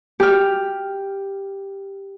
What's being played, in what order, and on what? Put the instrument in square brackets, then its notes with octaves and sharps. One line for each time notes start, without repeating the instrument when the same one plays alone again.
[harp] G4 F6